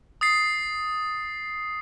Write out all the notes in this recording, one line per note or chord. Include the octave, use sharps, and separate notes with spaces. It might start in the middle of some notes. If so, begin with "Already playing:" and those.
D#6 A6 C7